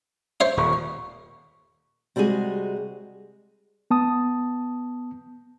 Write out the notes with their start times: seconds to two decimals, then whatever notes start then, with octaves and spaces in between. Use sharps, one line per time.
0.40 C5 C#5 E5
0.57 D#1 C#6
2.16 C3 G3 G#3 F#4 G#4
3.91 B3 A5 D#6